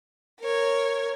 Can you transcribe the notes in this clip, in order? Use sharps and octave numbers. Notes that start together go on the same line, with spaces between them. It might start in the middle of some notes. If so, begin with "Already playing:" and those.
A#4 C#5